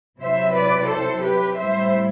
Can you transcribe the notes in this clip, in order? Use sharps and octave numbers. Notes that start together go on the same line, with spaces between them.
C3 F#3 C4 E4 C5 E5
B4 D5
A4 C5
G4 B4
A2 G3 C4 E4 C5 E5